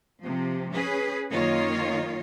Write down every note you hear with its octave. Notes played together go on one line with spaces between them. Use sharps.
C3 F3
C#4 G#4 B4
F#2 D#3 A#3 F4 C#5 D#5